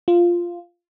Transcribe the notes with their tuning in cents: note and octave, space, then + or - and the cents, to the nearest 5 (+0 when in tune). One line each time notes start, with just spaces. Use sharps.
F4 -5